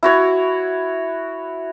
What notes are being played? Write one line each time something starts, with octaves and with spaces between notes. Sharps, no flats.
E4 F#4 C#5